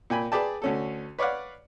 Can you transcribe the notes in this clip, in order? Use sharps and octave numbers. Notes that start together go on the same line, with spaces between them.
A#2 G5 G#5 B5
G#4 B4 D5 G5 A5
D2 C#4 A4
B4 C#5 D5 F5 F#5